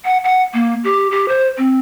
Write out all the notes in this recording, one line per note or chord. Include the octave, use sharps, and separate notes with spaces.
F#5
F#5
A#3
G4
G4
C5
C4